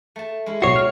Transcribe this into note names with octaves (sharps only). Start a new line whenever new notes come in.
A3 A5
G#3 C#4 E4
B1 F#4 C#5 C7
C4 F6